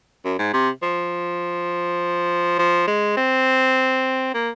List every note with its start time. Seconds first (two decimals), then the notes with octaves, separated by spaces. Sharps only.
0.25 F#2
0.39 G#2
0.54 C3
0.83 F3
2.59 F3
2.88 G#3
3.17 C4
4.34 A#3